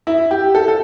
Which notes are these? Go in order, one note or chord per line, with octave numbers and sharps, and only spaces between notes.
E4
G4
A4
A4